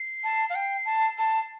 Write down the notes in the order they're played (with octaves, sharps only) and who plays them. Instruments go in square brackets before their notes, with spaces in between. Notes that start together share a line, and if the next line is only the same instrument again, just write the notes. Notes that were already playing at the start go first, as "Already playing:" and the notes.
Already playing: [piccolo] C7
[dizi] A5
F5
G5
A5
A5